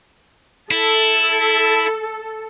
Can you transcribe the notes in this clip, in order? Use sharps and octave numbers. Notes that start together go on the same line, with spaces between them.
E4 A4